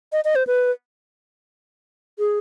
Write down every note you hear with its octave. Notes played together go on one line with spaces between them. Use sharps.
D#5
D#5
C5
B4
G#4